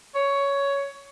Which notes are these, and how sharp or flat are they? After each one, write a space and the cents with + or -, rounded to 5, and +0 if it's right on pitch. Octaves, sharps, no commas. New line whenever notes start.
C#5 +10